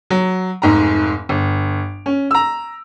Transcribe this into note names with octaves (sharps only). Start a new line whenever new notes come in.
F#3
F1 G#2 A#5
G1
C#4
A#5 E6